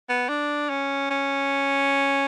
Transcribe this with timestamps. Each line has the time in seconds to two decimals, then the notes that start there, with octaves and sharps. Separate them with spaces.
0.09 B3
0.29 D4
0.69 C#4
1.10 C#4